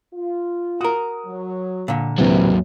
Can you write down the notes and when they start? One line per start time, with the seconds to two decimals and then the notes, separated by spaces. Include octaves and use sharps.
0.14 F4
0.81 F#4 A#4 D#6
1.26 F#3
1.88 A#2 D3
2.18 D#2 C3 E3 F#3 C4 D4 A#4 B4